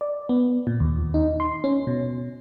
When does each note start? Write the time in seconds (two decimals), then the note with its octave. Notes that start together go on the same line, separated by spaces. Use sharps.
0.01 D5
0.29 B3
0.67 A#2
0.80 D#2
1.14 D#4
1.40 C6
1.64 C#4
1.87 B2